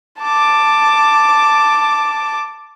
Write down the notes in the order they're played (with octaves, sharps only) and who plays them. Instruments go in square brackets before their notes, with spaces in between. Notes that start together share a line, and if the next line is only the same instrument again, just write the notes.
[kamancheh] A5 D6